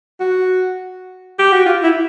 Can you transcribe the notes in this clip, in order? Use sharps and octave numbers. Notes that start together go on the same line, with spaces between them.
F#4
G4
F#4
F4
E4